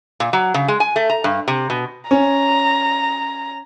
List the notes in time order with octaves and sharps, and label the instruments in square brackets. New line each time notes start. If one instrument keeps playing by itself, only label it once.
[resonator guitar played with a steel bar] A#2
F#3
C#3
G#3
G#5
A3
A#5
G2
C3
B2
[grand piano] C#4 [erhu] A#5